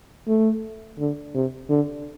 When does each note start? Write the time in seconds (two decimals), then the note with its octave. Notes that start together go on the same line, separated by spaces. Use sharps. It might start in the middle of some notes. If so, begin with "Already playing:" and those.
0.28 A3
0.99 D3
1.34 C3
1.70 D3